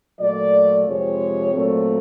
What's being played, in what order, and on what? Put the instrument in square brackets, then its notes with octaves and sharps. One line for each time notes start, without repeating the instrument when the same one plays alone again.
[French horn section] A#2 F#3 A3 D5
F2 C3 F3 G#3 C#5
A#2 F#3 A3 C4